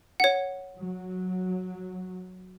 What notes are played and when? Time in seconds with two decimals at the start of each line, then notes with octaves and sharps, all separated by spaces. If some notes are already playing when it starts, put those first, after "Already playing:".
0.20 C#5 F#5
0.76 F#3